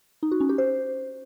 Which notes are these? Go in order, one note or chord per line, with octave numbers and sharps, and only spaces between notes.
D#4
F#4
C#4
G4
C5